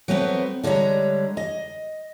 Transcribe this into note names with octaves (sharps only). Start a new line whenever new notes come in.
F#3 A3 B3 C4 B4
D3 G3 G#3 C#5 A#5
D#5